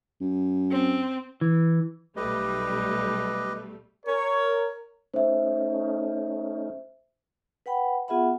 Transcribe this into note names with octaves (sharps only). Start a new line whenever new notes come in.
F#2
C4
E3
B1 G3 A3 G4 B4 D#5
A#4 C#5
A3 C#4 D#4 C5 E5
B4 F#5 G5 B5
B3 F4 G#4 E5 F#5 B5